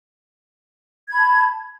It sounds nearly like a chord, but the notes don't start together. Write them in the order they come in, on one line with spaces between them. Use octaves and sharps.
G#6 B5 A5